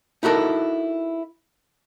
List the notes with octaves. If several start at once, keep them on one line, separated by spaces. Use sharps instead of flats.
D#4 E4 F#4 A4 A#4